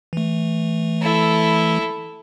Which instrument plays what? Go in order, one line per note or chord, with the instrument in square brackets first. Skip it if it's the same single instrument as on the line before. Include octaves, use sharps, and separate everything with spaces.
[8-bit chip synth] E3 A3
[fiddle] E4 A4